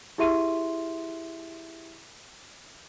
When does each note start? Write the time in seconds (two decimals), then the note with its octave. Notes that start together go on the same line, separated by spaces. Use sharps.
0.18 E4 G4 G#4 E5 C6 D#7